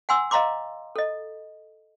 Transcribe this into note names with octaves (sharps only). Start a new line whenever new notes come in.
F#5 G#5 C6 E6
D#5 F5 A#5 C6 D6
A4 D#5